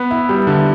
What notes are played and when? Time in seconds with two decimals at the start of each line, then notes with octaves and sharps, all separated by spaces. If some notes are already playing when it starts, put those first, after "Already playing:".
Already playing: B3
0.11 E4
0.29 G3
0.47 D3